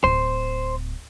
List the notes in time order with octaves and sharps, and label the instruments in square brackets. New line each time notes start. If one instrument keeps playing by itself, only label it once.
[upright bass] D1 [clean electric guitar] C5